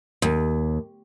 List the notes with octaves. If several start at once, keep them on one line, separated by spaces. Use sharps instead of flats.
D#2